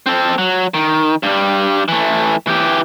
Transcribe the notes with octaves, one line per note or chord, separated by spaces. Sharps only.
C4 A4
F#3
D#3
G2 G3
E3 A3
E3 G4